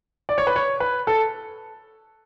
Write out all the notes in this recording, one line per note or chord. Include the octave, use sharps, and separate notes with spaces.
D5
C#5
B4
C#5
B4
A4